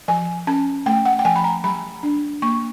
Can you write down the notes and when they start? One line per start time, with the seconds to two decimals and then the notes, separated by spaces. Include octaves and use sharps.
0.08 F3 G#5
0.47 C#4 A5
0.86 A3 G5
1.05 F#5
1.19 G5
1.25 F3 G#5
1.36 B5
1.44 A#5
1.64 F#3 B5
2.03 D4
2.42 A#3 C#6